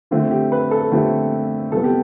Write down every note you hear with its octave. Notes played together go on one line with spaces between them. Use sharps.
D3 F3 A3 C4
G4
B4
A4
D3 F3 A3 C4 G4
C3 G3 B3 A4
G4